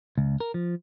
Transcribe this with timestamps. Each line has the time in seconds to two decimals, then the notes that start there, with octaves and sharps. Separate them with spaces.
0.18 C#2
0.40 A#4
0.54 F3